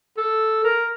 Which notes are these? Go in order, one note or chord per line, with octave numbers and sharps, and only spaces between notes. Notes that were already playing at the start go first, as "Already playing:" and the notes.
A4
A#4